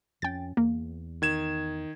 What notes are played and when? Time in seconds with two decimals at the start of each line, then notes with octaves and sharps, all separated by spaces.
0.22 F2 C#4 G5 A6
0.57 E2 A#3
1.22 D#3 G#6 E7